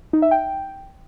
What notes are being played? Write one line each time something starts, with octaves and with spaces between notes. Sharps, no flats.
D#4
E5
G5